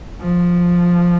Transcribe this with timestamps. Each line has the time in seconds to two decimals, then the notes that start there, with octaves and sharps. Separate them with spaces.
0.21 F3